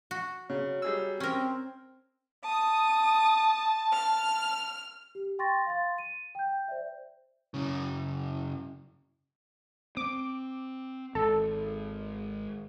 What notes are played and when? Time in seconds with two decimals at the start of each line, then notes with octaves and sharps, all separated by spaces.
0.11 F#4
0.49 C#3 F#3
0.82 G3 G#4 E6
1.20 C4 C#4 A#4
2.45 A5 D#6
3.92 F6
5.15 G4
5.39 G5 C6 C#6 A6 A#6
5.66 F5 C6 A6
5.98 D#7
6.35 G5 G6
6.68 C5 D5 E5
7.54 F#2 C#3
9.97 C4 D6
11.15 G#1 A4